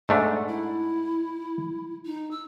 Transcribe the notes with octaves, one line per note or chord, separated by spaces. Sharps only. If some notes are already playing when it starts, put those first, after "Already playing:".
G#2 A3 D4 F#5
E4
D#4
E6